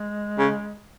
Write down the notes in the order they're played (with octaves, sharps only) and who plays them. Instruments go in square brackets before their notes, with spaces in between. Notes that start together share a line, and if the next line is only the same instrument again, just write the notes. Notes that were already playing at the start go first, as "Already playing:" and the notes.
Already playing: [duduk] G#3
[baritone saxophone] C#3